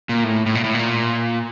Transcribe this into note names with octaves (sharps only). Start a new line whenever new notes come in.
A#2
A2
A2
A#2
A2
A#2